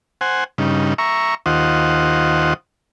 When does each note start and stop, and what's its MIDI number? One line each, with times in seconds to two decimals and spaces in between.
0.21 0.44 72
0.21 0.44 78
0.21 0.44 80
0.58 0.94 43
0.58 0.94 49
0.58 0.94 63
0.98 1.35 76
0.98 1.35 82
0.98 1.35 85
1.46 2.53 39
1.46 2.53 65
1.46 2.53 72
1.46 2.53 75
1.46 2.53 78